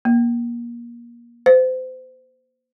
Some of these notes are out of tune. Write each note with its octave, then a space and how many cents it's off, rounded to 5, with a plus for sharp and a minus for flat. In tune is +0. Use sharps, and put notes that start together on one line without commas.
A#3 +25
C5 -30